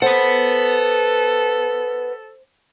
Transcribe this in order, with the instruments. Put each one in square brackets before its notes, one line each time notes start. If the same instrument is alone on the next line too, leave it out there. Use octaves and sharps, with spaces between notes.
[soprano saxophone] A4 [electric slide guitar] B4 F#5 [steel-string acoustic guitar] C5